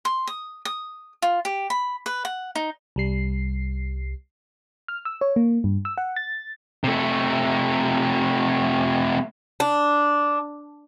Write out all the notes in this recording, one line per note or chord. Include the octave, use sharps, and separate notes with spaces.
C6
D#6
D#6
F4
G4
B5
B4
F#5
D#4
C2 G3 C7
F6
E6
C#5
A#3
G2
E6
F#5
A6
C3 A3
D4